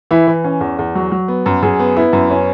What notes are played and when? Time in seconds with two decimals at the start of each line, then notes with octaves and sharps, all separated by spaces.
0.11 E3 E4
0.27 E3
0.44 C#4
0.61 E2
0.79 E2
0.95 F#3
1.12 F#3
1.28 B3
1.46 F#2
1.62 F#2 G#4
1.80 B3
1.96 B3 E4
2.13 F#2
2.30 B3 C#4